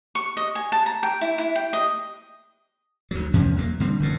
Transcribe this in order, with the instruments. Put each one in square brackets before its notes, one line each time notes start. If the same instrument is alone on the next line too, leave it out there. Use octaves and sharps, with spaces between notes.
[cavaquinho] C#6
D#5
G#5
A5
A#5
G5
E4
E4
G5
D#5
[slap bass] D2 F#3
E2 C3 F3 C#4
F#3 G#3 A#3
D3 G3 C4
F1 F#2 A2